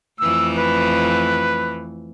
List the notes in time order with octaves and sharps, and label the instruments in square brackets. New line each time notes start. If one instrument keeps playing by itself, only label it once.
[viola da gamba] F2 E3 A3 [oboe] E6
[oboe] B4